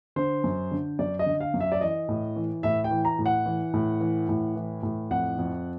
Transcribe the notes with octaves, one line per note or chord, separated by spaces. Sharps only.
D3 C5
F#2
D3
F#2 D5
D#5
D3
F5
F#2
E5
D5
E3 D#5
A2
E3
A2 E5
G5
E3
A#5
A2
F#5
E3
A2
E3
A2
E3
A2
F2 F#5
F2